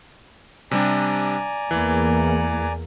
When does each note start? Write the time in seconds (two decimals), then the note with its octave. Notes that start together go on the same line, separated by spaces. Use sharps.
0.71 C3 G3 D4 D5 G#5 A#5
1.71 E2 E3 A#3